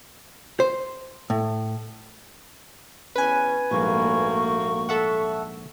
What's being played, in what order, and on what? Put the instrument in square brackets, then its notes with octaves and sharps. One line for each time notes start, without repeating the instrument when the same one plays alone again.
[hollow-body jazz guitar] C5
A2
[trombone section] E2 C#4 [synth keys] B4 G#5
[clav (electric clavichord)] A#1 G#2 G3 [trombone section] A3 A#3 F#4 [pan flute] C#6
[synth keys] A4 E5 F#5